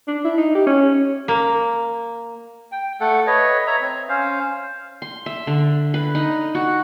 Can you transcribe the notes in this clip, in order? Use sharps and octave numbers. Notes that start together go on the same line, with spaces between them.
D4
E4
D#4
G4
C#4
A#3
G5
A3 A4 F#5
B4 C#5 D#5
C#5 E5 A#5
C4
C#4 C5 F5
C6
E5
D3
B4
D#4
F#4